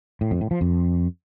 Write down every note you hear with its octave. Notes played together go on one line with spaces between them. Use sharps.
A2
F2
A2
F3
F2